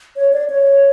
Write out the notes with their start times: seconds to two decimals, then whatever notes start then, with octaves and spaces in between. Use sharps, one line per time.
0.16 C#5
0.33 D5
0.50 C#5